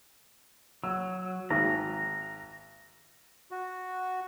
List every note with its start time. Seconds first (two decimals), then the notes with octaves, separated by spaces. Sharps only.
0.84 F#3 E6
1.50 G#1 A#5
3.51 F#4